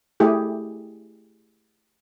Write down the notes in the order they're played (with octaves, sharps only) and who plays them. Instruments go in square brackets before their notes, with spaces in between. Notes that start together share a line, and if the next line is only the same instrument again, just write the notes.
[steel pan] A3 E4 G4 G#4